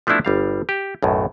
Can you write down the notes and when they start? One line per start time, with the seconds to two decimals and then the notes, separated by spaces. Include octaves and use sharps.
0.07 F3 A3 B3 D4 E4 F#4
0.25 G1 G3 F5
0.69 G4
1.03 B1 F#2 A2